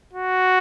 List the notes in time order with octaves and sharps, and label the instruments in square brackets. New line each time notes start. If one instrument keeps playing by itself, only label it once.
[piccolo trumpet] F#4